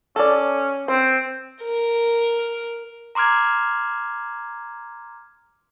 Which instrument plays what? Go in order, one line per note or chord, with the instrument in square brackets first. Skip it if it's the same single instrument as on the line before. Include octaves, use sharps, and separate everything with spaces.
[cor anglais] C#4 [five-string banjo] A4 D5
[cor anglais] C4 [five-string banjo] C5
[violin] A#4
[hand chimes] A#5 C6 D6 F6 G#6